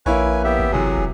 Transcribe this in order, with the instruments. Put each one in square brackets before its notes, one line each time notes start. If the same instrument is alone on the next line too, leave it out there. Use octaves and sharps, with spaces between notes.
[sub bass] A#1 [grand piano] A#3 E4 C#5 [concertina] B4 G#5
[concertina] B3 G4 E5
[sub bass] A1
[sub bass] G1 [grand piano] C3 E3 F#3 [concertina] G#4
[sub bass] E1